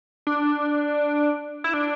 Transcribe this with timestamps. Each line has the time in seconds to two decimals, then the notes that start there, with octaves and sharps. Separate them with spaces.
0.27 D4
1.64 E4
1.74 D4